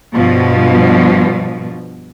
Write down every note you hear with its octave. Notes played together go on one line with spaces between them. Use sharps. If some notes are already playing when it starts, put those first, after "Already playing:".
G2 B2 F3